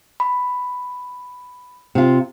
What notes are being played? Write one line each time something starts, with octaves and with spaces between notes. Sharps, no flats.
B5
C3 F4